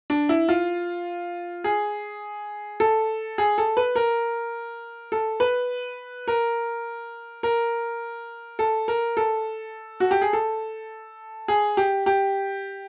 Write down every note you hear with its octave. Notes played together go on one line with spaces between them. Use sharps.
D4
E4
F4
G#4
A4
G#4
A4
B4
A#4
A4
B4
A#4
A#4
A4
A#4
A4
F#4
G4
G#4
A4
G#4
G4
G4